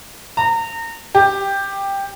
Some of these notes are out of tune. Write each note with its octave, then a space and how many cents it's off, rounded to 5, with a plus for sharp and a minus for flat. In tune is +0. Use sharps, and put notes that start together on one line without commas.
A#5 -30
G4 +10